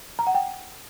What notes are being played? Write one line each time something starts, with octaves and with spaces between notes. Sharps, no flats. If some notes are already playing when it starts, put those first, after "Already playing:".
A#5
F#5
G5